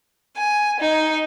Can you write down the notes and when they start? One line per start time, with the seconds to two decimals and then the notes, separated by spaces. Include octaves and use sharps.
0.39 G#5
0.81 D#4